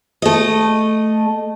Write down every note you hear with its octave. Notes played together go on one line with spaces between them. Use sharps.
A3 D#5